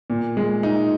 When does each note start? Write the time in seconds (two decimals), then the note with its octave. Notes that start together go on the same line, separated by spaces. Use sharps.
0.10 A#2
0.37 G#3
0.63 D#4